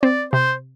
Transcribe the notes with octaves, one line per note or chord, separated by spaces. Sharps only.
C4 D5
C3 C5